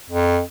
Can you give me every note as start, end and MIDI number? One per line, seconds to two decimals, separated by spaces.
0.10 0.40 41